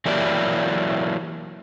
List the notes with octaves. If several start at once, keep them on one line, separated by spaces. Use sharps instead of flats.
E3 F#3 A#3 E4 G4 D5